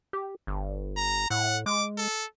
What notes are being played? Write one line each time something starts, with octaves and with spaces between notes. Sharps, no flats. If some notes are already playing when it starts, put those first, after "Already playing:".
G4
G1
A#5
A2 F#5
G#3 D6
A4